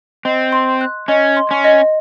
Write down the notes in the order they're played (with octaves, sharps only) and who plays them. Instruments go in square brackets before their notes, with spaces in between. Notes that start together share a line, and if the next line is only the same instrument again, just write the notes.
[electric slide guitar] C4 [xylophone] D#5
[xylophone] C6
F#6
[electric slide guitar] C#4 [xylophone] D#5
[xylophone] C6
[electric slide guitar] C#4
[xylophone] D#5